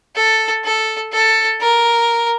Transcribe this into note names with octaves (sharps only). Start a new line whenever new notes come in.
A4
A4
A4
A#4